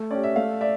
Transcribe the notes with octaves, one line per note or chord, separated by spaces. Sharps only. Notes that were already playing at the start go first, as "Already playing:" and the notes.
Already playing: A3
C#4 G4 D5
E5
A3 F5
D5 E5